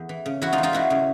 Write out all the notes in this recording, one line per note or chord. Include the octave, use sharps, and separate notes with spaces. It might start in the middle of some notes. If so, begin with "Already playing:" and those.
Already playing: E2
E3
C#3
E2 E4 F#4
D#4 F4
E2
D#4 F4
E3 E4 F#4
C#3